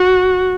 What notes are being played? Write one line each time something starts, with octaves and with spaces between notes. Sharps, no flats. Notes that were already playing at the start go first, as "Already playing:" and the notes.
Already playing: F#4